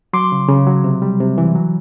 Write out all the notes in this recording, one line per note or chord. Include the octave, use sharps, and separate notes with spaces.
F#3 C6 D6
C#3
C#3
F#3
C3
G3
C3
E3
F#3